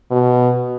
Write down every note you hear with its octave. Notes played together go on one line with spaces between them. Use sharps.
B2